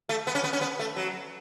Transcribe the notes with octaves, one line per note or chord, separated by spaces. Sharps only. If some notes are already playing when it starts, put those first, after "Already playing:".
A3
B3
C#4
B3
C#4
B3
A3
F#3